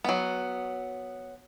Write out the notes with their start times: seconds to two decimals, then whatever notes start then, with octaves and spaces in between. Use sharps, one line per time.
0.04 F#3 B3